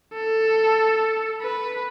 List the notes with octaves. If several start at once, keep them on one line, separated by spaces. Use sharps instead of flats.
A4
B4